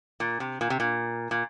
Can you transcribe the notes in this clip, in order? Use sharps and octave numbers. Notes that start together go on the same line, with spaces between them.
A#2
C3
A#2
C3
A#2
A#2